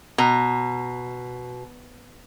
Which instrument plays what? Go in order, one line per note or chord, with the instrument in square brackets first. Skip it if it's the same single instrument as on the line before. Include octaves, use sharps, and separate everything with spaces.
[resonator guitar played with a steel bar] B2 [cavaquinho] A#5